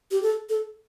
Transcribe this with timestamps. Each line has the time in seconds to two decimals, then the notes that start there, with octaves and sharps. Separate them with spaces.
0.11 G4
0.22 A4
0.49 A4